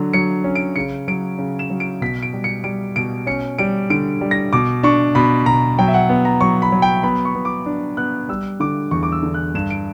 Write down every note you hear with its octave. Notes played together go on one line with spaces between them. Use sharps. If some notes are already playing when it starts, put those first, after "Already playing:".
Already playing: D3 F#3
F#3 C#7
C#4
D7
C#3 C#7
F#3 D7
C#3
E7
F#3
D7
B2 B6
D7
G3
C#7
G3 D7
B2 D7
C#4 C#7
G3 D7
D3 D7
G3
A#6
B2 D6
D4 C#6
B2 B5
B2 A#5
F#3 G5
E5
F#5
B3
A#5
F#3 C#6
B5
F#3
G5
B3 B5
C#6
B3
D6
D4
B3 F#6
G3 E6
D3 D6
E2 C#6
D6
E6
D3
F#6
G2 E7
D7